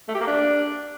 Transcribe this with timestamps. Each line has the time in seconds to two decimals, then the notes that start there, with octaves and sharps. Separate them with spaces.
0.09 A3
0.15 G4
0.21 A#3
0.27 D4